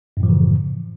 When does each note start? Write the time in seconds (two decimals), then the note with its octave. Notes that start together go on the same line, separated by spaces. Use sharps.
0.17 F#2
0.20 A2
0.23 F3
0.26 E3
0.29 C#3